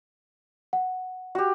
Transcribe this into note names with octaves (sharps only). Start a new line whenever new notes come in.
F#5
F#4 G4